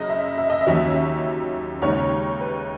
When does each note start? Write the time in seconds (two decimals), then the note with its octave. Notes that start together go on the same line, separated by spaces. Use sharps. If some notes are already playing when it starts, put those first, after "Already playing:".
Already playing: F#1 F#2 C#3 D#5
0.10 E5
0.38 E5
0.50 D#5
0.61 E5
0.67 D#2 D#3 F#3 C#4
1.82 D#2 C#3 G#3 D#4 C#5
2.41 B4